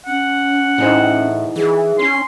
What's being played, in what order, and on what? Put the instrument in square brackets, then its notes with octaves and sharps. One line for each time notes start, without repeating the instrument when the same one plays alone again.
[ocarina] C#4 [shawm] F#5
[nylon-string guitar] E2 D#4 C5 [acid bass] A2
[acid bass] E3 [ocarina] G#4
[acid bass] C#4 [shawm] C6